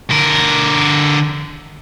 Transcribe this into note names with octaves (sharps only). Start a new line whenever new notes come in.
D3 A#4